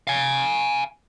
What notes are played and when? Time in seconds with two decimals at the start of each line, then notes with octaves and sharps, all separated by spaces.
0.07 F5 G#5